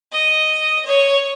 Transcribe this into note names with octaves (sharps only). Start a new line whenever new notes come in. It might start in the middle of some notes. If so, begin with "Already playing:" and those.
D#5
C#5